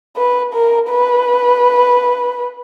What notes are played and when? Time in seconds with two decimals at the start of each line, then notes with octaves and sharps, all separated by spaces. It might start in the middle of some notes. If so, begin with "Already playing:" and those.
0.17 B4
0.53 A#4
0.90 B4